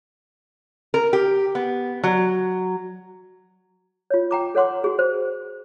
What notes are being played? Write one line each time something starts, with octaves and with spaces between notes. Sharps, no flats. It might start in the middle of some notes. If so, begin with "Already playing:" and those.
A#4
G4
B3
F#3
F4 C#5
G5 A#5 D6
A4 C#5 F#5 C6 D6
F#4 G#4
C5